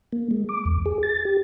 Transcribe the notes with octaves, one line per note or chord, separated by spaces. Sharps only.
A#3
G#3
D6
E2
G#4
A6
G4